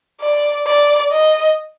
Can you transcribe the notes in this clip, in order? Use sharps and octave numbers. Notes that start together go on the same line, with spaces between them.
D5
D5
D#5